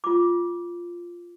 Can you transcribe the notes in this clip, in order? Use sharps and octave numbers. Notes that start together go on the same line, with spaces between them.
F4 D6